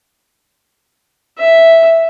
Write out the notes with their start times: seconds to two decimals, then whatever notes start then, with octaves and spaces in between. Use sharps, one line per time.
1.39 E5